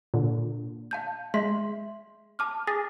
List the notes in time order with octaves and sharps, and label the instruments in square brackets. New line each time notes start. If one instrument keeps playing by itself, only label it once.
[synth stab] A#2 D3
[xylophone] F5 A5 G6
[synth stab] G#3 [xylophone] E5 C6 B6
[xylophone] A5 D6 F6
[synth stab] G#4 [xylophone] A6 A#6